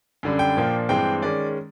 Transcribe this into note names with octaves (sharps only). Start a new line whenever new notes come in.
F#2 D3 G3
G5
A#2 F3 A#3 D4
G2 E3 G#3 C4 G5
D#3 G#3 C#4 D5